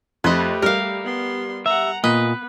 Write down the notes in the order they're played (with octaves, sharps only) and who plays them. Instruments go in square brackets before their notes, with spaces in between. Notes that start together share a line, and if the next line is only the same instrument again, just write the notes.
[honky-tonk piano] F2 C6 F#6 [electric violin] A3 G4 [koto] B4 D#5
[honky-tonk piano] G3 [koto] A#4 F5
[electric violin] B3 C6
[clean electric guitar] E5 [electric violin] F#5 A#5
[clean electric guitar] A#2 D#5 [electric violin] B3 [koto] B4